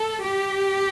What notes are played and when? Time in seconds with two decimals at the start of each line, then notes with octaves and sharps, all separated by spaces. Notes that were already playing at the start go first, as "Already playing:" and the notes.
Already playing: A4
0.23 G4